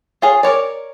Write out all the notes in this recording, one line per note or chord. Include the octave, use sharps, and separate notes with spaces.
F4 G#4 C#5
A#4 C#5 D5